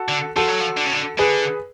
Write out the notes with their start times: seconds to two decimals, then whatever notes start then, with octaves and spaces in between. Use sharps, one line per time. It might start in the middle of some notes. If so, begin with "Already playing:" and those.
Already playing: F#4 A4
0.09 D3
0.36 F3 F#4 A4
0.48 F#3
0.60 F3
0.77 D3
0.85 C#3
0.93 D3
1.19 D3 G#4 B4